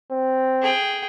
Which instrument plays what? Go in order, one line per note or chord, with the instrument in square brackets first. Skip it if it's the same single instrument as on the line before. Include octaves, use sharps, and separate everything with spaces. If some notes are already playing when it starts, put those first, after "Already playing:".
[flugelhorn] C4
[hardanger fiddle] G#4 G5